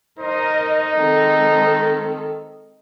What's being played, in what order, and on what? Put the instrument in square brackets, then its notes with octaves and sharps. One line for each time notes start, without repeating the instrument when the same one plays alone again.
[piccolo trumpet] D#4 [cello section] A#4 D#5 [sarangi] C5
[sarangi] D#3 [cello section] G#3 C4 A4